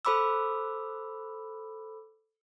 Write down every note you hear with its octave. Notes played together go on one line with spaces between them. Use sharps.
A4 C5 B5 D6 E6